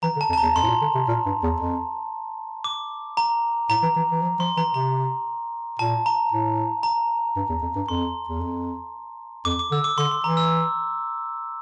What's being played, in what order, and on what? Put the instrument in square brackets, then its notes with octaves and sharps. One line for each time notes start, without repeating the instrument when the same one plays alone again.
[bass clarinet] E3 [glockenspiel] A#5
[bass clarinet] D3
[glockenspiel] A5
[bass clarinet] F2
[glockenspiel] A5
[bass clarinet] E2 [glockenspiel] A#5
[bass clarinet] F2 [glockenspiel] C6
[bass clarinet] A2
A#2
D3
C3
A#2
G2
E2
F2
[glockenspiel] D6
A#5
[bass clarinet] A2 [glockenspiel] A#5
[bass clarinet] E3
E3
E3
F3
[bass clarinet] F3 [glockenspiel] C6
[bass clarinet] E3 [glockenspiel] A#5
[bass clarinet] C3 [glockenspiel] A#5
[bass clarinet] A#2 [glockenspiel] A5
[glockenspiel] A#5
[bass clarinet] A2
[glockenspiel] A#5
[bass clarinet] G2
E2
F2
G2
[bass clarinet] F2 [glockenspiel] C6
[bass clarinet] E2
F2
[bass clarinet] F2 [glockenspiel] D6
[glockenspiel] D6
[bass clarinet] D3 [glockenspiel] E6
[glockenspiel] D6
[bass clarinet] D3 [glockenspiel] C6
[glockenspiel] C6
[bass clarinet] E3 [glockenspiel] A#5
[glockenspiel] E6